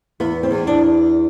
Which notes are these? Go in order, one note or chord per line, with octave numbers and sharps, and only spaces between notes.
E2 B3
C4
E2
D4